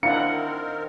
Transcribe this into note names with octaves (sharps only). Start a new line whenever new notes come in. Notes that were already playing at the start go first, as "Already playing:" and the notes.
D#3 C4 D4 E4 A#4 F5 F#5 C#7